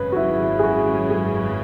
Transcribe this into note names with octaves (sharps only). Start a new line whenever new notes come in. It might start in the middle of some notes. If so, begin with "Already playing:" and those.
Already playing: G#1 F#2 C#3 B4
F#4
E4
G#4
F#4
G#4